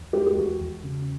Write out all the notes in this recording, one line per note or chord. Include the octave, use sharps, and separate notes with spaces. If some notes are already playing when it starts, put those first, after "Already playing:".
Already playing: E2
G#3 G4
G4
E2 F#4
E2
C#3